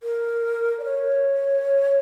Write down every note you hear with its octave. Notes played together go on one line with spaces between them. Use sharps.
A#4
D5
C#5